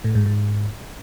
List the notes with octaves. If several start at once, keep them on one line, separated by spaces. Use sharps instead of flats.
A2
G#2
G#2